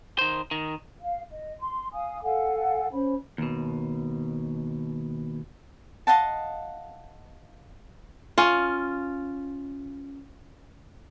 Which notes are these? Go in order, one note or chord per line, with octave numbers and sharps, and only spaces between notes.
D#3 C5
D#3
F5
D#5
C6
F5 G#5 D#6
A4 F5 F#5 G#5
C#4 C5 B5
D#2 B2
D#5 F5 F#5 A5
C#4 F4